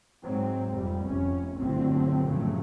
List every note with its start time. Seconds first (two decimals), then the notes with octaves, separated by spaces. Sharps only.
0.24 G#2 F#3 C4
0.72 F1 G3
1.06 F1 C#4
1.59 G1 C2 A2 D3 F#3 C4
2.27 G2 A#2 C#3 F3 F#3 A3